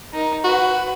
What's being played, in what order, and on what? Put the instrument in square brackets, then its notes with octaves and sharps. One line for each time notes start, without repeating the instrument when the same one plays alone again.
[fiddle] D#4 A#4
[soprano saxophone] F#4 [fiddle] B4